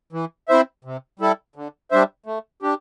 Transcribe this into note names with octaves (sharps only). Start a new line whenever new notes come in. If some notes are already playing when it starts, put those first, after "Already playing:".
E3
C4 E4 C5 E5
C3
G3 E4 A4
D3
G3 D4 C5 E5
A3
D4 G4